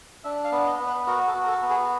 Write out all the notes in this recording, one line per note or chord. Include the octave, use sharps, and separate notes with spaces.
D4 E5
F5
B3
D#5
B3
B4
F#4 A#4
A4
F#4
A#4
A4
B3
G#4